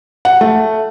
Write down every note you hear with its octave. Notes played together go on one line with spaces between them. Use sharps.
F#5
A3